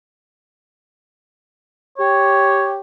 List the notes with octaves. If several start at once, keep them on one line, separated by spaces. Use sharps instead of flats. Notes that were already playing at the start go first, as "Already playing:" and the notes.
G4 C#5